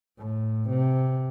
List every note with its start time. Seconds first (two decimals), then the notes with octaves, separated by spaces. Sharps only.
0.18 A2
0.70 C3